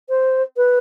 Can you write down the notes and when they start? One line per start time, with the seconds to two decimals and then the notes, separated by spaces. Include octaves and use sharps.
0.09 C5
0.57 B4